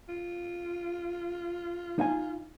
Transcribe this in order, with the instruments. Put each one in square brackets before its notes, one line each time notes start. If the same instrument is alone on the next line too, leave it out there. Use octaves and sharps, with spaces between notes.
[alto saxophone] F4
[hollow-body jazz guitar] D#4 F5 G#5